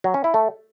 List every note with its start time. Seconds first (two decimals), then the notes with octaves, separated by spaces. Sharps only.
0.04 F#3
0.14 C#4
0.24 E4
0.34 A3